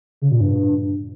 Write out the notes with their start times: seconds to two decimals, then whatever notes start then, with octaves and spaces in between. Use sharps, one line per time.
0.22 C#3
0.31 A#2
0.41 G2